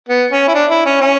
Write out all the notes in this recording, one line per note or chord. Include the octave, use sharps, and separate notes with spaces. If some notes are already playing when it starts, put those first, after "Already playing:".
B3
C#4
E4
D4
E4
C#4
C#4